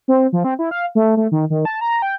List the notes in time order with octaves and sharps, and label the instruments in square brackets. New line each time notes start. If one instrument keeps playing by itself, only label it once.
[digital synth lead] C4
F3
C4
E4
F5
A3
A3
D#3
D#3
A5
A#5
G5